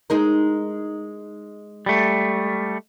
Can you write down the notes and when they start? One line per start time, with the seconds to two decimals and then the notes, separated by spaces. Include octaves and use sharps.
0.10 G#3 D#4 A#4
1.86 G3 A3